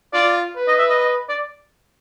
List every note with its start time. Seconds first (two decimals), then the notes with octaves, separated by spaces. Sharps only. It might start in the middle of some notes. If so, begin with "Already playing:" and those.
0.13 F4 D5
0.57 B4
0.68 D#5
0.79 E5
0.90 D#5
1.00 D#5
1.29 D5